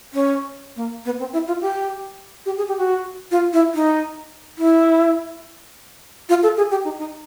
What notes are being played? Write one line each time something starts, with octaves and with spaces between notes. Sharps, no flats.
C#4
A#3
B3
C4
E4
F4
G4
G4
G#4
G4
F#4
F4
E4
D#4
E4
F4
A4
G#4
G4
D#4
D#4